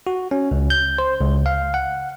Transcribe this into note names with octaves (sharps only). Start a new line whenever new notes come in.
F#4
C#4
C#2
G6
C5
C#2
F5
F#5